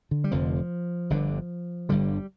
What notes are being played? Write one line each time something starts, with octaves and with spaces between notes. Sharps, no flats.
D3
G3
F1 F2 D3 F3
G1 G2 D3
G1 G2 D3 G3